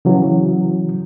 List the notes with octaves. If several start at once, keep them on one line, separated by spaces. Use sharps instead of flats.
C#3 E3 F#3